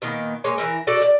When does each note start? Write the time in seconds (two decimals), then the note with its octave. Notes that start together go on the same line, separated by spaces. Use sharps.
0.02 A#2 D#3 A#3 B3
0.44 G#3 A#3 C#5 G#5
0.58 E3 E4 A#4
0.87 D4 F#4 A4 D5
1.01 D5